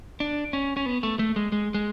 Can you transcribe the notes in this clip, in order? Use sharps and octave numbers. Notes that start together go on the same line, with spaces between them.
D4
C#4
C#4
B3
A3
A3
G#3
G#3
G#3